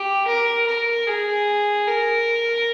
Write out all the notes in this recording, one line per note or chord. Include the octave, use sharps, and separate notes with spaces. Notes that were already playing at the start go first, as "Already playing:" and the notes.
Already playing: G4
A#4
A#4
G#4
A#4